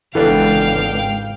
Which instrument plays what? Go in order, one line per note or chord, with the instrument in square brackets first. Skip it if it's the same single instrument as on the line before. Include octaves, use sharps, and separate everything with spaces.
[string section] G#1 C#2 [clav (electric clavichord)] E3 B3 D4 [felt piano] A4 [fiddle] F5 G5